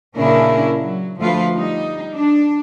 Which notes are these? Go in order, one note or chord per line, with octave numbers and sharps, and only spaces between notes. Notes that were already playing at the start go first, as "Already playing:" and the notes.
A#2 C#3 C#4 D4 E4 A#4
F#3
D2 F3 A3 F4 B4
G3 D#4
D4